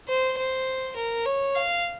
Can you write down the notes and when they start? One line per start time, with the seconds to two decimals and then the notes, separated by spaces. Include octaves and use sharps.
0.08 C5
0.38 C5
0.96 A#4
1.25 C#5
1.55 F5